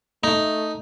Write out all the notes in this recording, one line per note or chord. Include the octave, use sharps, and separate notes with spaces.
A3 D#4